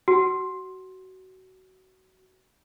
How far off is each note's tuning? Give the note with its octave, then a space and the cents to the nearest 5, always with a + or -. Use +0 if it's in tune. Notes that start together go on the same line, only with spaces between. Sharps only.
F#4 +20